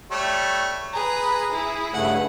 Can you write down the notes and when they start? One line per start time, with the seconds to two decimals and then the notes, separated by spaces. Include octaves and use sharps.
0.11 G3 A3 C#5
0.94 G#4 B4 A#5
1.53 E4 G#4
1.94 G2 C#3 A3 F#5